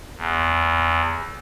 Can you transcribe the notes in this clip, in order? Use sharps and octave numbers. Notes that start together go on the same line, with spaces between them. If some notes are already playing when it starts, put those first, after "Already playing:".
E2